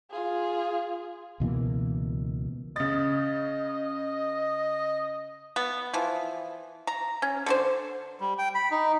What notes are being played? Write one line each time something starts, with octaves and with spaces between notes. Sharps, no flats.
F4 G#4
C#2 B2 E3 A#3
C#3 D#5 A6
B3
E3 F3
A#5
C#4
D3 D4 C5
G3
G5
B5
D#4